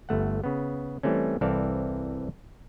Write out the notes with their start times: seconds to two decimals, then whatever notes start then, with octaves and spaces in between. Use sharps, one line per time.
0.09 G1 A3 F#5
0.44 C#3 B3
1.03 E3 G3 A3 C4 C#4
1.41 C2 E3 C4 A4 D5 F5